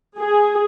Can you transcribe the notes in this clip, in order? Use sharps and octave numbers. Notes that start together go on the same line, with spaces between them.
G#4